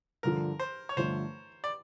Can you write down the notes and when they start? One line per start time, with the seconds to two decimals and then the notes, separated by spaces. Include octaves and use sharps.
0.23 G2 D3 F3 A#4
0.60 C5
0.89 C#5
0.97 G2 D3 F3 A3 C5
1.64 D5